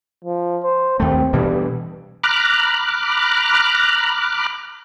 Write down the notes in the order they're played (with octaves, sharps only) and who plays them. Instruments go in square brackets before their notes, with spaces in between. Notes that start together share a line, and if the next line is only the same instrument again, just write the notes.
[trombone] F3
C5
[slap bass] D#2 A3 [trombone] C4
[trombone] G2 [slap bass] B2 E3 G3
[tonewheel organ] A#5 B5 D6 F6 F#6